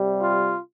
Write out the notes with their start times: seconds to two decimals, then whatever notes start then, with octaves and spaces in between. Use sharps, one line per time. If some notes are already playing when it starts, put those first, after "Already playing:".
Already playing: C3 G3
0.20 F4